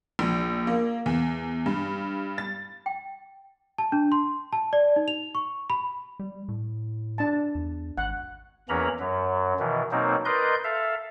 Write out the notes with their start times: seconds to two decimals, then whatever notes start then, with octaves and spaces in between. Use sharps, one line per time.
0.19 A#1
0.67 A#3
1.06 E2
1.66 G2
2.38 A6
2.86 G5
3.78 A5
3.92 D4
4.12 C6
4.53 A5
4.73 D5
4.96 D#4
5.08 F7
5.35 C#6
5.70 B5
6.19 G3
6.48 A2
7.18 D4 A5
7.55 E2
7.98 G#1 F#5
8.69 E2 E3 A#3 C#4 A#5 B5
9.00 F#2 F#3
9.59 B2 D#3 E3
9.91 B2 F#3 A#3 C4 D#4
10.25 A#4 B4 D5 D#5 C6 G6
10.64 A4 E5 F5